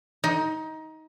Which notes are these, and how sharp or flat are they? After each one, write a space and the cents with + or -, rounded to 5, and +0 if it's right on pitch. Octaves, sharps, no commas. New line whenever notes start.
D#4 +20